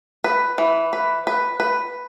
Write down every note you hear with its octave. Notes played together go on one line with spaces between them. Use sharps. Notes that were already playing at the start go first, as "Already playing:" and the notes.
B4
E3
B4
B4
B4